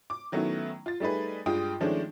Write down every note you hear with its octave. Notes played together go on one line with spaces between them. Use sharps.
D6
D#3 F#3 A3 B3 C#4 E4
F4 A6
G3 A3 D#4 G#4 B4
G2 G#3 F4 G5 D#6
D#3 F3 G#3 A3 C#4 D4